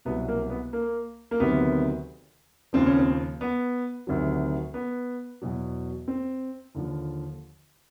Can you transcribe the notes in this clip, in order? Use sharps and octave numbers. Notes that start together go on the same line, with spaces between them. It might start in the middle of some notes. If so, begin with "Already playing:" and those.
C2 B2 F#3 B3
A#3
B3
A#3
A#3
D2 C3 D#3 F#3 B3
D#2 C#3 F3 C4
C#4
C4
B3
D2 C3 D#3 F#3
B3
E2 B2 F#3
C4
D#2 D3 F3